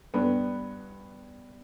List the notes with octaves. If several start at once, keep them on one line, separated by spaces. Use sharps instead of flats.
G2 B3